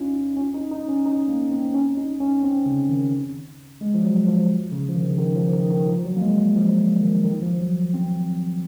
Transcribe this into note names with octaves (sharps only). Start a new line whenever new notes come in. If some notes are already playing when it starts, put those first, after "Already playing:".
Already playing: C#4 D#4 F4
C#4
D#4
D#4
C#4
D#4
A#3
C4
C#4
D#4
C#4
C4
C#3
D#3
G#3
F3
F#3
F3
C#3
F3
D#3
C#3
D#3
F3
D#3
D#3
F3
F#3
A#3
G#3
F3
D#3
D#3
F3
F#3
C4